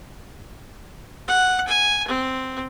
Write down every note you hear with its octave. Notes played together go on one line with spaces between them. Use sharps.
F#5
G#5
C4